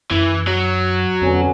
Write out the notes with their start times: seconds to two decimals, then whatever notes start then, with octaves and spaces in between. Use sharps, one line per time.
0.11 F#2 E3
0.47 F#3
1.22 F2 B2 D3 C#4